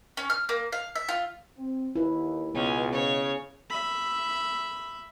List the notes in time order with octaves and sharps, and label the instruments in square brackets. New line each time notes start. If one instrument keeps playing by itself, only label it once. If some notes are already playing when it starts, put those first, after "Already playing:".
[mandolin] C#4
F6
A#3
F5
E5
F4
[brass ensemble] C4
[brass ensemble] D#2 [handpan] E4 B4
[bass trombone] C#2 [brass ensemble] B2 [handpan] B3 [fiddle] C#4
[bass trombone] C#3 [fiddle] C#5
[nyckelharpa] E5 B5